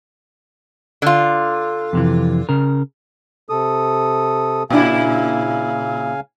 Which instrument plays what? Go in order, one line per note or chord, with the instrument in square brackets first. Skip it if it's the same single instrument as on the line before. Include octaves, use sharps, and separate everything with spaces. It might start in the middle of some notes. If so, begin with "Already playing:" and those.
[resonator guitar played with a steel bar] D3 F4
[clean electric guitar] F2 C3 E3
C#3 A#4
[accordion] C3 A4 D#6
[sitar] A#2 D4 E4 [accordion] C#3 F5 G#5